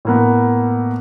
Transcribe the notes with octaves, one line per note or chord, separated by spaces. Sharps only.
A2 A#3 B3